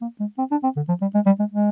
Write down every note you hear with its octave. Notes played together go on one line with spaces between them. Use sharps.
A#3
G#3
C4
D4
C4
D3
F3
G3
G#3
G3
G#3
G#3